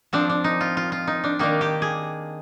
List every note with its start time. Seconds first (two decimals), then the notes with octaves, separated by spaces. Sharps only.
0.13 F3 C4 D4
0.30 D4
0.44 D#4
0.61 F4
0.77 F4
0.92 F4
1.07 D#4
1.24 D4
1.39 D#3 A#3 D4 D#4
1.61 G4
1.82 G#4